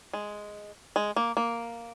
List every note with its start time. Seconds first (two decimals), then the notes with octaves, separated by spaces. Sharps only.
0.13 G#3
0.96 G#3
1.16 A#3
1.37 A#3